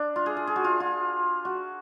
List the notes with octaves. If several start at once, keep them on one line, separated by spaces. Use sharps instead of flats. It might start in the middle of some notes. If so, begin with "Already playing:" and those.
Already playing: D4
F4
G#4
G#4
G#4
F#4
F4
F4
F#4